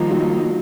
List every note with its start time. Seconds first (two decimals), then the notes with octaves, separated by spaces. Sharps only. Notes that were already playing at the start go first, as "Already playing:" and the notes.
Already playing: D#3 F3 G3 A#3 D#4
0.11 F#3